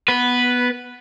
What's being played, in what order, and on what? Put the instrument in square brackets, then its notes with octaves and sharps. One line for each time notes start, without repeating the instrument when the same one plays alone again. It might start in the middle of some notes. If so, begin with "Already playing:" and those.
[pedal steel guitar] B3 [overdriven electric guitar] B4